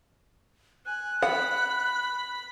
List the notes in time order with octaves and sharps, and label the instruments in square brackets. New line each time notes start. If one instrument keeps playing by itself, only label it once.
[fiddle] G#5 [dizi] F#6
[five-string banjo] F#5 [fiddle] B5